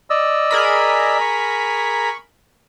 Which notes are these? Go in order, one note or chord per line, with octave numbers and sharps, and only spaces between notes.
D5 D#5 E6
G#4 A#4 B5
C#6